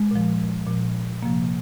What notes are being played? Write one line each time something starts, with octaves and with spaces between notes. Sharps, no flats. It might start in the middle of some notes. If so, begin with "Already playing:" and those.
Already playing: G#3
A#2 F3
A#2 F3
C3 F3 A#3